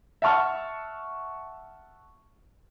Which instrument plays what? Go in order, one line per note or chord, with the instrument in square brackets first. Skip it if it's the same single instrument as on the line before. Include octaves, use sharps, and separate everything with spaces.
[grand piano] E5 F#5 A5 C#6 F6